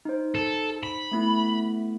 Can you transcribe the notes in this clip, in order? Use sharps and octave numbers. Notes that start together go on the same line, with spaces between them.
D#4 C5
A4
B5
A3 B3 E4